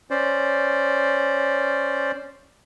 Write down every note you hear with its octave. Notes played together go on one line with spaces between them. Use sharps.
C#4 C5 D5